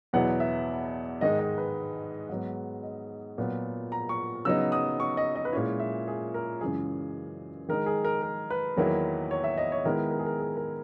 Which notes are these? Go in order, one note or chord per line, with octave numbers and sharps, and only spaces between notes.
E2 B2 F#3 B3 E4 F#5
E5
G#2 D#3 G#3 D#4 D#5
D#5
B4
G#2 F#3 B3
D#5
A#2 F#3 B3
A#5
C#6
C#3 F#3 B3 D#4 E6
D#6
C#6
D#5
D#5
B4
A#2 G#3 C#4 E4 C#5
E5
G#4
A#4
F#2 C#3 E3 G#3 G#4
D#3 G#3 D#4 A#4
G#4
A#4
A#4
B4
E2 D#3 F#3 A#3 E4
C#5
E5
D#5
C#5
D#3 G#3 B3 E4 A#4
A#4
G#4
A#4
G#4
A#4